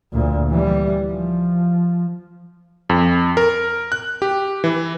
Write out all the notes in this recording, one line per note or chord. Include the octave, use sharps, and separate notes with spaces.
D2 A#2
E3 G3
F3
F2
A#4
F#6
G4
E3